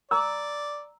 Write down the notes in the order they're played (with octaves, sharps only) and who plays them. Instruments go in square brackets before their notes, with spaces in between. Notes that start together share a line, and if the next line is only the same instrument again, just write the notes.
[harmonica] D5 [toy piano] A#5 E6